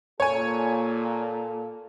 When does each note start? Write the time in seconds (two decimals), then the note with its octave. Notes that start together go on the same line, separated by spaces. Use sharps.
0.20 A#2 A4 C#5 G#5